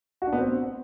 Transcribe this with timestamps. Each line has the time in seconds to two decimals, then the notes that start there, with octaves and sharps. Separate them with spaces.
0.22 F#4
0.27 D4
0.33 B3
0.38 C4